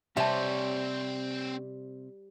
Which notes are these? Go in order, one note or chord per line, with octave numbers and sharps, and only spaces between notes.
C3 G3 C4 G4 C5 C#5 E5 A5